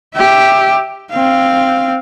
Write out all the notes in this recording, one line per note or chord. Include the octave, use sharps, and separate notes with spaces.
G4 E5
C4 F5